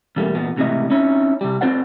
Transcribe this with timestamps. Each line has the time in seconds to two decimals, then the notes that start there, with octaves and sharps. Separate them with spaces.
0.16 B1 E2 G3 A3 A#3
0.35 E2 A#2 B3
0.57 C#2 A2 C3 E3 E4 D#5
0.90 C4 C#4 D#4 E4 C#5
1.41 C3 G3
1.61 C4 F4 C5 D5 F#5